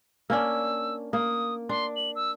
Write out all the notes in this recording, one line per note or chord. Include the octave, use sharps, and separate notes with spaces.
A#3 C#4 D4 E6
A#3 D#6
D4 C6
F#7
E6